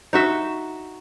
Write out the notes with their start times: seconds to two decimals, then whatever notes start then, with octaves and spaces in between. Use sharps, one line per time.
0.13 D#4 F#4 E5